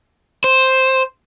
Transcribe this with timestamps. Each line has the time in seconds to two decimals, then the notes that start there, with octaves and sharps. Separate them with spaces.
0.44 C5